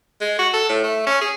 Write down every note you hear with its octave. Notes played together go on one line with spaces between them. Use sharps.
G#3
F#4
A4
A2
A3
C#4
G#4